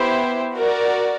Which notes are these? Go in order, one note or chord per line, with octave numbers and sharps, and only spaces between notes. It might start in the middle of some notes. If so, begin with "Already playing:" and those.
Already playing: B3 E4 G4 C5 E5
F#4 A#4 D5